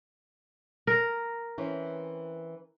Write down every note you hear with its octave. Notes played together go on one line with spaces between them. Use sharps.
A#4
E3 C4 C#4